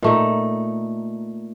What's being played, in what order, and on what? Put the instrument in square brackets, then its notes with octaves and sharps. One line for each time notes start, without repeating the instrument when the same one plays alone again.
[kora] A#2 A3 D#4